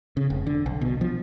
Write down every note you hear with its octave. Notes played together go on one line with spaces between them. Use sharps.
C#3
F1
D3
B1
B2
F3